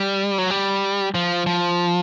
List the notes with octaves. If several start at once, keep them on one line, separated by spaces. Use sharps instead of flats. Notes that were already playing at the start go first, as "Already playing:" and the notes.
Already playing: G3
F#3
G3
F3
F3